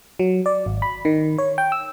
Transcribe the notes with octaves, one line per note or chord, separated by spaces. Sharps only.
F#3
D5
G#1
B5
D#3
C#5
G5
E6